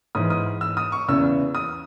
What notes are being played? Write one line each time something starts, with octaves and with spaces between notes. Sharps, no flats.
G#2 E3 D#6
D#6
E6
D#6
C#6
E2 C#3 E3 E6
D#6